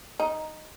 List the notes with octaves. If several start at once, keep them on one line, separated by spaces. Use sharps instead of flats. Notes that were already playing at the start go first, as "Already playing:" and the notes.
D#4